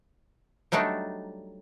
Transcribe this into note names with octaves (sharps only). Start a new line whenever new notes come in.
F#3 G3 A3 D4 D#4